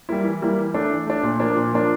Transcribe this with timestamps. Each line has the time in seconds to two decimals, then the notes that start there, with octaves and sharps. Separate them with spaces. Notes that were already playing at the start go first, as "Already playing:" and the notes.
0.09 G3 A#3 E4
0.25 E3
0.42 G3 A#3 E4
0.58 E3
0.74 A3 D4
0.91 E3
1.07 A3 D4
1.23 A#2
1.39 F3 A#3 D4
1.56 A#2
1.72 F3 A#3 D4